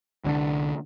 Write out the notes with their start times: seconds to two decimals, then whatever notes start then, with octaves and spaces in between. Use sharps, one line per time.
0.24 C2 D3 D4